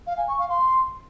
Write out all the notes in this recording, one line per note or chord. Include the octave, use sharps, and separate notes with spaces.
F5
G#5
C#6
F5
C6